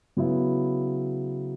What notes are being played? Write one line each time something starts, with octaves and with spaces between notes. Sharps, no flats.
C#3 F#3 B3 E4